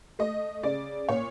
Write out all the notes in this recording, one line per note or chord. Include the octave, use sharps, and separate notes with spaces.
A3 D#5
C#3 D5
A#2 C#5